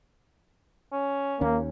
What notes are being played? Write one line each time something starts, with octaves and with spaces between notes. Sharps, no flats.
C#4
D#2 A#3 C#4